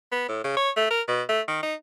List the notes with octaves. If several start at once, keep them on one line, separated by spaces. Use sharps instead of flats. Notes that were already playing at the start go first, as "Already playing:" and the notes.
B3
A2
C#3
C#5
A3
A#4
B2
A3
D#3
D#4